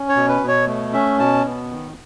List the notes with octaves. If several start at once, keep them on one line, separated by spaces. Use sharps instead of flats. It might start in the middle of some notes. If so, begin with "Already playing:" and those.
Already playing: C#4
C#5
B2
B4
B2
C#5
A3
C#4 E5
B2 A5
B3
D#3